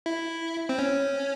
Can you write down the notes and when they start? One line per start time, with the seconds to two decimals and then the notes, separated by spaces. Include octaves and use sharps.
0.06 E4
0.69 C4
0.79 C#4